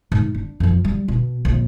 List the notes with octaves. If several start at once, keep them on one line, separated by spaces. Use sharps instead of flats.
G#2
D4
F2 F3
G3
B2
A#1 C3